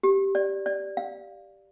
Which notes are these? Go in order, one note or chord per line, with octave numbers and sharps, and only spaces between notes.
G4
D5
D5
F5